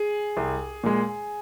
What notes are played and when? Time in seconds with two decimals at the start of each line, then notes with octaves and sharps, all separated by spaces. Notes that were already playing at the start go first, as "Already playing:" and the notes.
Already playing: G#4
0.37 C2
0.84 A#2 G#3